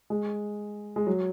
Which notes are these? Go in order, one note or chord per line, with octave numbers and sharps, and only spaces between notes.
G#3
G#3
F#3